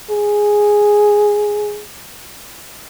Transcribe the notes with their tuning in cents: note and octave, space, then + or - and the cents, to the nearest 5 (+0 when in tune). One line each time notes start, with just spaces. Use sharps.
G#4 +0